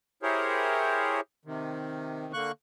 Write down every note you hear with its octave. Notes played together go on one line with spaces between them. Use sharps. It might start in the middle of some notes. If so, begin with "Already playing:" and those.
E4 G4 G#4 A#4 C5 C#5
C3 D#3
D3 A#3 C#6 F#6